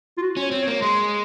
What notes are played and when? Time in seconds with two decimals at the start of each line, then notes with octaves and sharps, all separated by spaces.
0.18 F4
0.22 F#4
0.37 C#4
0.42 C#5
0.51 C4
0.62 C#5
0.67 A#3
0.82 G#3 C6